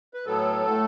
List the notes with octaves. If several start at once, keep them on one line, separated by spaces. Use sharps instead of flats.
B4
A2 F#3 B3 A4
A2 A3